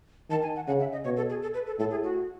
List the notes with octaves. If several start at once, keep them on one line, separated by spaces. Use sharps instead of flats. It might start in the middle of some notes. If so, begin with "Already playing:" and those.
D#3 A5
G#5
F#5
C#3 F#5
E5
D#5
B2 C#5
A4
G#4
A4
B4
A4
A2 A4
G#4
F#4